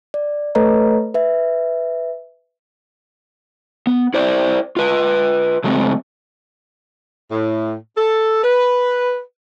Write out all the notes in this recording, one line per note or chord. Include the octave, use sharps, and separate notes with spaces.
D5
A3 A4 B4 C#5 D#5 A#5
B4 E5
B3
E4 C5 D5
F4 B4
C#3 F#3 G#3 A3 B3 C4
A2
A4
B4